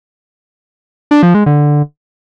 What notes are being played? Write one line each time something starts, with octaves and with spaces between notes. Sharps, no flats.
D4
F3
G#3
D3